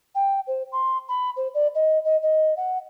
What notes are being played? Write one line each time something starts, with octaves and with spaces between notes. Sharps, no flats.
G5
C5
C6
B5
C5
D5
D#5
D#5
D#5
F#5